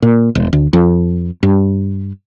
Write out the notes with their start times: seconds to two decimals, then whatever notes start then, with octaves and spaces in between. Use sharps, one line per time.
0.02 A#2
0.35 E1
0.53 D2
0.73 F2
1.43 G2